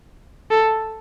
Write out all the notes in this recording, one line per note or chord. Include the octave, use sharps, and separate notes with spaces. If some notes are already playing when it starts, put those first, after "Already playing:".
A4